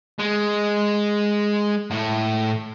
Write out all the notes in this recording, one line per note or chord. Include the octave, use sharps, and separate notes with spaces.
G#3
A2